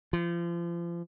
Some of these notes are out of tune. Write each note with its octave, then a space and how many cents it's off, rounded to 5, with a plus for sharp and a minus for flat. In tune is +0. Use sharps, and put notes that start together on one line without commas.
F3 -35